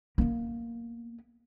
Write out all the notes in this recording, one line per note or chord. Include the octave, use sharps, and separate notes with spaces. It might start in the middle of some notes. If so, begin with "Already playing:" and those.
A#3 B3